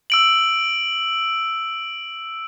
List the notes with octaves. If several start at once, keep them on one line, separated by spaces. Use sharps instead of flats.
E6 D7 F#7